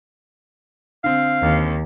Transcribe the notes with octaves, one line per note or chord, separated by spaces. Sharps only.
D3 C4 F5
D#2